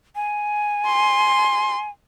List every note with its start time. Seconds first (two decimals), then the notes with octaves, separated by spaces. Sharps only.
0.16 G#5
0.87 C6